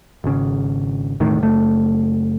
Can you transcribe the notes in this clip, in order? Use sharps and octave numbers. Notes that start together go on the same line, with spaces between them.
G#1 C#3
E1 A2 D#3
F#1 A3